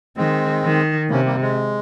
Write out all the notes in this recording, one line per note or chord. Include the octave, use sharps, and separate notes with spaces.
D#3 G#3 C4
D#3
C3 A#3 C#4
G3 A#3
G#3